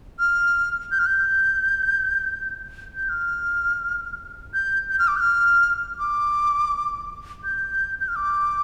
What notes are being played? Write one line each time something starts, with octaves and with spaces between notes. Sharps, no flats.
F6
G6
F6
G6
G6
F6
G6
G6
F6
D6
G6
F6
D6
G6
G6
F6
D6